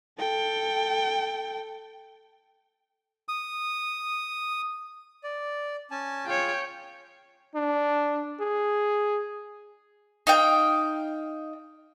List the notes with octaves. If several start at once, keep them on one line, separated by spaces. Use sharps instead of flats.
A4 G5
D#6
D5
C#4 G#5 A5
F4 G#4 C#5 F5 G5
D4
G#4
D#4 F5 G5